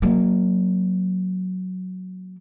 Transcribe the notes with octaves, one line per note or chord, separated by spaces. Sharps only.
F#3 A#3